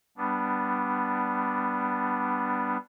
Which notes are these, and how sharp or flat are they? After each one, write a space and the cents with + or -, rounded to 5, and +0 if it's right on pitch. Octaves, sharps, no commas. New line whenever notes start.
G3 -5 B3 +0 D4 +0